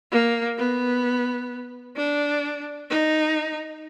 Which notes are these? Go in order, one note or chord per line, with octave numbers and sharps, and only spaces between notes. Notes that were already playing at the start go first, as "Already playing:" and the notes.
A#3
B3
D4
D#4